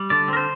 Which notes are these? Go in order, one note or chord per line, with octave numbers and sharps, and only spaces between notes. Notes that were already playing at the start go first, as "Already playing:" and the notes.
Already playing: G3
D3 D5
C4 A#4
C5